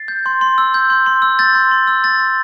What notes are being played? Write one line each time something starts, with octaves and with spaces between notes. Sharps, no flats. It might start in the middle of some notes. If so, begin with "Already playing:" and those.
Already playing: A6 C7
G6
C6
C6
E6
G6
C6
C6
E6
G6 A6
C6
C6
E6
G6 A6
C6